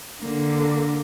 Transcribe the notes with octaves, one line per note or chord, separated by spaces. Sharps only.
D3 A#3